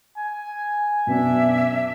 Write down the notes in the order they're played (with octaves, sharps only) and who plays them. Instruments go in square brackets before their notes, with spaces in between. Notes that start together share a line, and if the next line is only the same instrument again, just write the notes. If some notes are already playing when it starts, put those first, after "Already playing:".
[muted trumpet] G#5
[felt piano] F#2 B2 [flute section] D4 E5